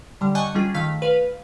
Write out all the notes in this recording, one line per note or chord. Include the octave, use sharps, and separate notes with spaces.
D3 G3
D#5 G#5 A5 C#6 F#6 G6
G3 C#4 F4 G#4
D#3 A3 F5 F6 B6
B4 F5